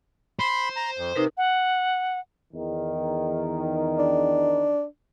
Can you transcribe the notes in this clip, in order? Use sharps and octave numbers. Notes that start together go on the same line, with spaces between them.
C5 B5 C6
A#5
F2
C3 D#4 A#4 B4
F#5
E2 D#3
D4